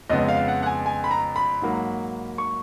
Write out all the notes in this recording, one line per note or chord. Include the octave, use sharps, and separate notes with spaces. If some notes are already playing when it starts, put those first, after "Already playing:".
F2 C#3 G#3 B3 D#5
F5
F#5
F#5
G#5
G#5
B5
A#5
B5
G#2 F#3 A#3
C#6